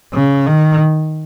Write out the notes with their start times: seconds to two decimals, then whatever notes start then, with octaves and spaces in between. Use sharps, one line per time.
0.14 C#3
0.46 D#3